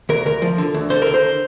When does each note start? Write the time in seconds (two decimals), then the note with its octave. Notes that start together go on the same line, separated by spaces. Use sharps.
0.09 D2 A#4
0.26 D2 A#4
0.42 F3
0.58 D3
0.74 D2
0.90 D3 C5
1.02 D2 A#4
1.14 C5